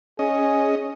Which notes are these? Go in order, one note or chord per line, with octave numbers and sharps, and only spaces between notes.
C#4 G#4 D#5